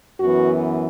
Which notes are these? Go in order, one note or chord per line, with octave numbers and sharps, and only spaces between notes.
F#2 E3 B3 F#4